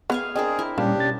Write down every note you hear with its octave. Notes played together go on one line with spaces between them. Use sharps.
B3 G#4 F5 G#5
C4 D4 G#4 A#4 D#5
E4
A#2 G3 A#3 C#4 D4 G4
B2 C#4 A6